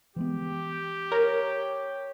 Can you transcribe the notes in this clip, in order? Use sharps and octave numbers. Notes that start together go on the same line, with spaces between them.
E3 G#3 B3 G4
A#4 C#5